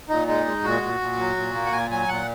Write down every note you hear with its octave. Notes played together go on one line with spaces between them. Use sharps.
A#2 D#4
G#3 D#4
G#3
A#2 F#4
A#2
A#2
F#3
A#2
A#3
F#5
A#2 G#5
F#3 G#5
A#2 F#5